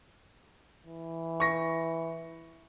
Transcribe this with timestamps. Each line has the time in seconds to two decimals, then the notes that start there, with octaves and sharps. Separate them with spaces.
0.87 E3
1.40 C#6 A#6